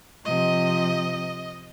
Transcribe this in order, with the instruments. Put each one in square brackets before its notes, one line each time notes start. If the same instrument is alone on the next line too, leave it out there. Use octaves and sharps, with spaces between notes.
[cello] C3 F3 [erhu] D#5